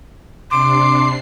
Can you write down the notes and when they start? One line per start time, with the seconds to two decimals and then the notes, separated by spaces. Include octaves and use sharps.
0.51 C3 D4 C6 D6 C7